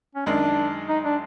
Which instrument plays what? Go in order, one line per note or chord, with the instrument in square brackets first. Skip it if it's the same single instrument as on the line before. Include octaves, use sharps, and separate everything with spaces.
[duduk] C#4
[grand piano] F#2 D#3 G#3 [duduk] D4
[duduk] D#4
D4